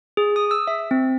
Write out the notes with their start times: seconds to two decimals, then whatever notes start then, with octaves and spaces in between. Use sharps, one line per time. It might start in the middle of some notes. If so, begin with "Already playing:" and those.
0.17 G#4
0.36 D#6
0.51 E6
0.67 E5
0.91 C4